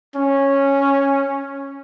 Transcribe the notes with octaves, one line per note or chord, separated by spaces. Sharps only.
C#4